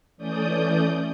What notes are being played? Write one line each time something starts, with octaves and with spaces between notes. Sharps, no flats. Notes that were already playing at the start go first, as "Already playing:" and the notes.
E3 A3 C#4 D5 D#6 G6